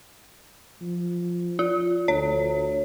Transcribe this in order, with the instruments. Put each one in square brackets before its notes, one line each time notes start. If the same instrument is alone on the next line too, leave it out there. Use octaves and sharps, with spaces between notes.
[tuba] F3
[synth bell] F4
[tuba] D2 [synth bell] C#5